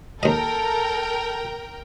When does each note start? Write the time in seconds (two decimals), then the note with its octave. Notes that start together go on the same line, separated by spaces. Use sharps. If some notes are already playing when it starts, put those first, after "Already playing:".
0.23 D#2 A4 A#4 D#5 G5